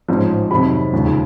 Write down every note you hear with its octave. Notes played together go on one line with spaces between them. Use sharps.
A1 G#2 F3 G#3
F2 C3 D#3 F#3 B5
E1 D#2 C#3 F3 G#3